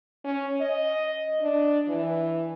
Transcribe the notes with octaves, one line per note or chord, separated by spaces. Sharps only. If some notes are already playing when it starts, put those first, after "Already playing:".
C#4
D#5
D4
E3